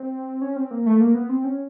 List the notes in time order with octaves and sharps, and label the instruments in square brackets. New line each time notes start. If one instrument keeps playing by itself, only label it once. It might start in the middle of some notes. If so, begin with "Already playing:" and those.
Already playing: [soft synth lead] C4
C#4
C4
A#3
A3
A#3
B3
C4
C#4